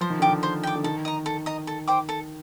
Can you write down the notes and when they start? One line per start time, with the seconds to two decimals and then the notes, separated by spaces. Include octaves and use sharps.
0.01 F3 C5
0.10 D#3
0.20 D3 G5 D6
0.29 D#3
0.43 C5
0.63 G5 D6
0.75 D3
0.84 D#3 A4
1.05 D#5 A#5
1.26 A4
1.46 D#5 A#5
1.67 A4
1.88 C5 G5 D6
2.09 A4